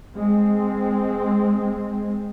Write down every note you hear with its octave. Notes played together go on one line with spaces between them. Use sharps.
G#3 C4